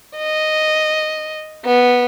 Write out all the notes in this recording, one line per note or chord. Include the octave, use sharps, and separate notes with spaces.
D#5
B3